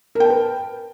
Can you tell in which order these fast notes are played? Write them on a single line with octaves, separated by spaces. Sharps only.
A#4 G5 A5 B4